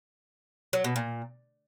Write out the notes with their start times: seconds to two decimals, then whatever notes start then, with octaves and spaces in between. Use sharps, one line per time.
0.73 F#3
0.84 B2
0.96 A#2